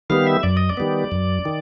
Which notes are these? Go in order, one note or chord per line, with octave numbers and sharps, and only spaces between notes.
D#3 G3 B3 F5
E5
F#2 D5
D#5
D5
D#3 G3 B3
F#2
D#3